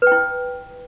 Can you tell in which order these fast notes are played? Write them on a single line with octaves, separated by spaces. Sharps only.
B4 G5 E4